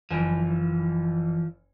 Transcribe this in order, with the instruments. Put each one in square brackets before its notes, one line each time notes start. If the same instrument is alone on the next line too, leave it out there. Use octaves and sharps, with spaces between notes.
[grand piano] F#1 G#5 [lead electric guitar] E3 F3